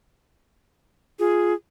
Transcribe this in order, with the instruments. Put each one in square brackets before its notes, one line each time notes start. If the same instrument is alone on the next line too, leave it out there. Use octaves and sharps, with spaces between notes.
[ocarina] F4 [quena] G#4